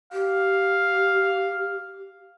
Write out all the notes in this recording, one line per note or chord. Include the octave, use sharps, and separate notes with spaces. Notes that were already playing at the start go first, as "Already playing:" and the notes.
G4 F5